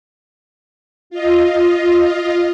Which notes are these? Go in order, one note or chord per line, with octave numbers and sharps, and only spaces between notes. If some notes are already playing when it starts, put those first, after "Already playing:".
F4 D#5